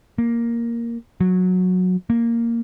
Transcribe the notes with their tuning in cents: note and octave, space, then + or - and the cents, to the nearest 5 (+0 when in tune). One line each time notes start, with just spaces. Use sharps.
A#3 +0
F#3 -15
A#3 -5